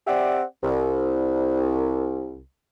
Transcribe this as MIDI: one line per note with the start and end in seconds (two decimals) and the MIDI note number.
0.06 0.42 60
0.06 0.42 67
0.06 0.42 74
0.06 0.42 76
0.06 0.42 78
0.63 2.41 36